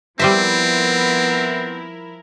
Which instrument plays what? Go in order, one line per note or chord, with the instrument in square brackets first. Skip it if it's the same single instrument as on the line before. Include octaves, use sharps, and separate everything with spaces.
[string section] F3 E4 A#4 [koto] G3 C5 E5 [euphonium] B3 [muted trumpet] C4